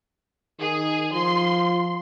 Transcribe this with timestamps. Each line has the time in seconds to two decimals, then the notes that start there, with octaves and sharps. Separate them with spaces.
0.60 D#3 G#4
1.13 F3 C6